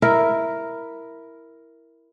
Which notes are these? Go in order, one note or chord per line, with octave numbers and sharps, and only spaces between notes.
E4 A#4